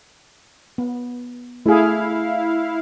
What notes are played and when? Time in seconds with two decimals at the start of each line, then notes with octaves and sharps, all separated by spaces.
0.78 B3
1.66 A3 E4 G#4 F5